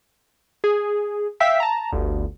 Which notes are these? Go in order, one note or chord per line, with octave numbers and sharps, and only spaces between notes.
G#4
E5 F5 G5 E6 B6
A5 A#5
G1 D2